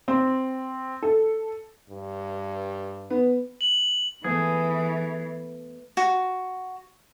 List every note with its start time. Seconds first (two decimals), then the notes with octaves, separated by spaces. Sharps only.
0.08 C4
1.03 A4
1.90 G2
3.10 B3
3.61 F#7
4.24 E3 A3 B3 G#4
5.97 F#4